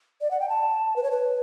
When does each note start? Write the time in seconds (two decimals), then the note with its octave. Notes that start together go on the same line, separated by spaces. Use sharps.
0.21 D5
0.31 F#5
0.40 G5
0.49 A5
0.96 B4
1.03 C#5
1.11 B4